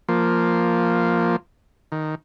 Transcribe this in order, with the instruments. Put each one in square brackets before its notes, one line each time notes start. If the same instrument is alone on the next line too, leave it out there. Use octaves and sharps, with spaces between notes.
[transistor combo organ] F3 A#3
D#3